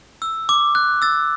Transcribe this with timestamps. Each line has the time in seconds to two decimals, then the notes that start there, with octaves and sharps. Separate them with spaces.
0.22 E6
0.49 D6
0.75 F#6
1.02 E6 A6